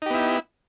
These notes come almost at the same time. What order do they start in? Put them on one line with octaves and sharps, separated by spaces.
D#4 G4 B3 E4